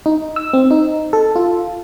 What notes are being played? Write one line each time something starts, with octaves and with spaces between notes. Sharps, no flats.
D#4
E6
C4
D#4
A4
F4